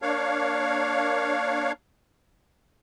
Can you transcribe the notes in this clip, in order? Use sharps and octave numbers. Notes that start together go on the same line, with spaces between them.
A#3 D4 C#5 F5